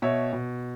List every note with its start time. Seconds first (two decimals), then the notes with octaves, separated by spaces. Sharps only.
0.02 B2 C#5 E5
0.33 B2